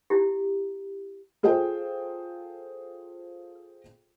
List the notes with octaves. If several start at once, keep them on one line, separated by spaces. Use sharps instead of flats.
E4 G4
F4 G#4 A4 C5 G5